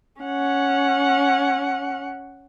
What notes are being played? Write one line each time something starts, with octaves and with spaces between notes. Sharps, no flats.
C#4 F#5